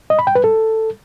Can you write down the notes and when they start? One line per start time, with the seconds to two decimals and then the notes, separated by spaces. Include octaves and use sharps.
0.10 D#5
0.19 B5
0.27 G5
0.35 B4
0.44 A4